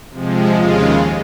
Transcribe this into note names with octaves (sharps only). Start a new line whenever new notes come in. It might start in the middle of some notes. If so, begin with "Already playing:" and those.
C3 F3 G#3
D#2 C#3 G#3 F4